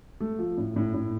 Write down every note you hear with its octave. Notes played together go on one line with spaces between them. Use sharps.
A3
F3
A2
A2
A2